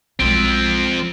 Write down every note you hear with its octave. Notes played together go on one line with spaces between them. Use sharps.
B1 F3 G#3 C4 D7